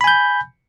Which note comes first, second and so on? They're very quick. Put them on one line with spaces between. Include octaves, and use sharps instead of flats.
B5 G#5 G6